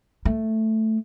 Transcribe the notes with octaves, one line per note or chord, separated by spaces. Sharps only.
A3